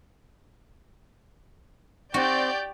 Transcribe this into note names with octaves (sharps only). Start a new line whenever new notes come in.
C4 F#4 G4 D5 G6